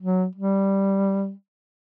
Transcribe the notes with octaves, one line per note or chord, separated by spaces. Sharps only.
F#3
G3